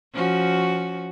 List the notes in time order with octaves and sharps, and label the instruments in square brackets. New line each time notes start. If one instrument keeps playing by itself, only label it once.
[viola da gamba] F3 C#4 F#4